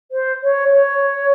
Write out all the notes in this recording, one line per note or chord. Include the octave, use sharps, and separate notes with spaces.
C5
C#5
C#5